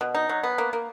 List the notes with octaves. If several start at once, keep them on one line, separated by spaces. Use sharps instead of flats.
B2
D#4
F#3
B3
A#3
A#3